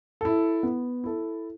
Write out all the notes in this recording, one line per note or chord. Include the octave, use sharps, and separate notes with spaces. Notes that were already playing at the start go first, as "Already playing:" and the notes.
E4 A4
B3
E4 A4